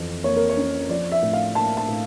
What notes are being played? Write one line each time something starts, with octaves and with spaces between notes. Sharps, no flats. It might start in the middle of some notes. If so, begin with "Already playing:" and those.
Already playing: F2 E3
A#3 C#5
A#4
C#5
C#4
F3 D5
E5
A2
F5
A#3 A5
A5
A2